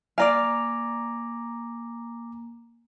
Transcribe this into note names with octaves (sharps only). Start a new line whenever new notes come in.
A#3 D5 F5 G#5 A#5 D6